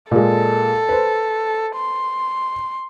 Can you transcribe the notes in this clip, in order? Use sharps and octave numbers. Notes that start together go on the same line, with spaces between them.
A#2 G#3 A4
B4 C5
C6